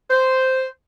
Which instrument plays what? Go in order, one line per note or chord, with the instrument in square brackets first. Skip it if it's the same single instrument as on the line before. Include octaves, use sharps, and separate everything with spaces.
[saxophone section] C5